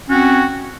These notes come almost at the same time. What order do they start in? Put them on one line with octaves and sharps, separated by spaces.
C#4 F#4 C4